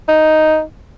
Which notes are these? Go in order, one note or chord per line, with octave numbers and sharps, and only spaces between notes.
D#4